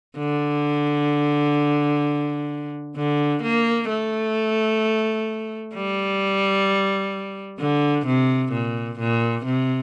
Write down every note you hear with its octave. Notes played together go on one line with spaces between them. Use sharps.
D3
D3
A#3
A3
G3
D3
C3
A#2
A#2
C3